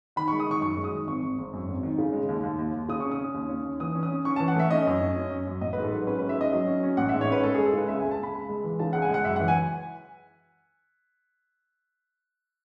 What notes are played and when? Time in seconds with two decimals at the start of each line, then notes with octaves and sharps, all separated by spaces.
0.16 D#3 B5
0.28 C#6
0.32 G#3
0.40 D#6
0.47 D#3 C#6
0.61 F#2 C#6
0.77 G#3
0.84 D#6
0.92 D#3
1.07 G#1 C#6
1.23 G#1
1.38 G#1
1.53 F#2
1.68 G#1
1.83 D#3
1.98 C#3
2.13 G#3
2.29 D#2
2.43 D#2
2.59 D#2
2.74 D#2
2.89 C#3 D#6
3.00 C#4 C#6
3.11 D#6
3.19 C#4
3.34 D#2
3.49 C#4
3.65 D#2
3.80 E3 D#6
3.95 C#4
4.03 D#6
4.11 C#4
4.25 C#4 C#6
4.36 A5
4.40 E3
4.48 F#5
4.55 A3 E5
4.71 C#4 D#5
4.86 F#2
5.01 C#4
5.16 C#4
5.31 F#2
5.47 F#2
5.61 A1 D#5
5.73 B4
5.77 G#2
5.84 A4
5.92 F#3 B4
6.06 C#4 B4
6.18 B4
6.21 G#2
6.29 E5
6.37 C#4 D#5
6.53 F#3
6.67 C#4
6.83 C#4
6.97 A1 F#5
7.09 E5
7.13 G#2
7.21 C#5
7.28 C#4 B4
7.43 G#3 A4
7.54 G#4
7.58 G#3
7.66 A4
7.73 C#3 B4
7.88 C#2 E5
7.99 G#5
8.03 C#2
8.11 A5
8.19 C#2 B5
8.33 C#2
8.49 G#3
8.64 E3
8.79 C#3 A5
8.93 C#2 F#5
9.02 G#5
9.09 G#3 F#5
9.25 F#2 E5
9.36 F#5
9.40 E3
9.48 G#5